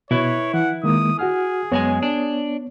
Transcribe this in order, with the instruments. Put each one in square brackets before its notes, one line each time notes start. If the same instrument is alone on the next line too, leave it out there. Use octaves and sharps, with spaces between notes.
[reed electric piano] B2 [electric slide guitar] E4 B4 [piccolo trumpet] C#5
[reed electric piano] E3 [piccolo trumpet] F#5
[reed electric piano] D#3 G#3 A#3 [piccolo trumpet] D#6
[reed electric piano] F#4 F#5 F6 [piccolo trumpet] G#4
[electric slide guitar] F#2 G#3 G#5 [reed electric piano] B3 C#5
[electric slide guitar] D4